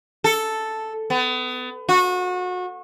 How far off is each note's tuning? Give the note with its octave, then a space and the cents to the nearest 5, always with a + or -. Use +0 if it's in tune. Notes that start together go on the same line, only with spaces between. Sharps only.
A4 +0
B3 +30
F#4 -30